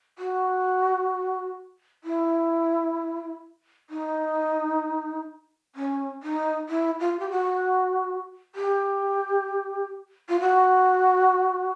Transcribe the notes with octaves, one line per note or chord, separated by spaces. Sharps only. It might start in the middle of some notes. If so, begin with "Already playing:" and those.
F#4
E4
D#4
C#4
D#4
E4
F4
G4
F#4
G4
F4
F#4